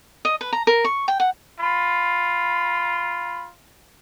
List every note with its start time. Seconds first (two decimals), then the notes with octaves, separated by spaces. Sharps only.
0.25 D#5
0.41 B4
0.53 A#5
0.67 A#4
0.85 C#6
1.08 G5
1.20 F#5
1.60 F4 B5